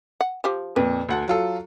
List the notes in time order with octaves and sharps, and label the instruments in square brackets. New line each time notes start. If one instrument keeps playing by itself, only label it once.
[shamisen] F#5
F3 G4
[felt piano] F2 A#2 [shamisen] B4
[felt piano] D2 F#5 A5
F#3 F4 A4